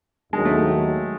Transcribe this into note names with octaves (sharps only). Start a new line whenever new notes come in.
D#2 D#3 F#3 G#3
A3